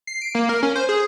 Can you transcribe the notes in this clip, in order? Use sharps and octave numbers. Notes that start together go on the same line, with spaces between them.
C7
D7
A#3
A#4
C#4
C5
G#4